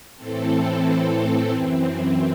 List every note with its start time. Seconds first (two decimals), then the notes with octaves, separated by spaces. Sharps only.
0.16 A2 E3 C4 A4
1.51 F#2 E3 C4